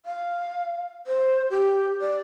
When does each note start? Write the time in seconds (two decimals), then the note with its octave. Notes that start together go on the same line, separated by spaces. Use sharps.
0.06 F5
1.07 C5
1.50 G4
2.01 D5